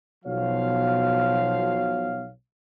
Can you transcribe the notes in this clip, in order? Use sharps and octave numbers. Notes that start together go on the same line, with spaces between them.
B1 B2 F3 F#4 C#5 F5